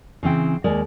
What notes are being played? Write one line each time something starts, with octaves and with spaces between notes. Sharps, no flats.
C#3 E3 C4 G5
D#2 G#3 A#4 D5